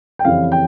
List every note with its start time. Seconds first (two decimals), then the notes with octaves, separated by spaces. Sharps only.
0.19 G5
0.25 F2 C#3 E3 G3 C#4 F5
0.52 G5